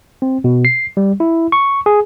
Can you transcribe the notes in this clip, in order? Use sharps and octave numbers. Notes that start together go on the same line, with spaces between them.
C4
B2
C7
G3
E4
C#6
G#4